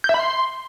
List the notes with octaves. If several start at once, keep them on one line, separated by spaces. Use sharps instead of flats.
G6
E5
B5
C6